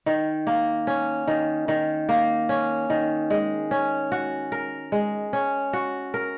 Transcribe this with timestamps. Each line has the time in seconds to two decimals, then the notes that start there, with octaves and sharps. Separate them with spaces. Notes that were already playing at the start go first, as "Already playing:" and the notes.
0.06 D#3
0.47 A#3
0.87 C#4
1.27 D#3
1.68 D#3
2.09 A#3
2.49 C#4
2.90 D#3
3.30 G#3
3.71 C#4
4.12 F#4
4.52 A#4
4.92 G#3
5.33 C#4
5.73 F#4
6.14 A#4